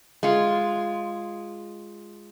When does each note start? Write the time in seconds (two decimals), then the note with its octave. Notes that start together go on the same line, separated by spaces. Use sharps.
0.23 G#3 F4